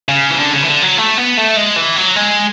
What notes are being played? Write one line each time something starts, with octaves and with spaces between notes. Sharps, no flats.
C#3
E3
D3
C#3
E3
D3
F#3
A3
B3
A3
G#3
E3
F#3
G#3